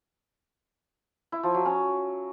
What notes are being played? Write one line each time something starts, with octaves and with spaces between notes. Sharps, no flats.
E4
F3
F#3
C#4